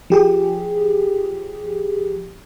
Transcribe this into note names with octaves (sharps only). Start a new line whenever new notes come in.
F3 G4 G#4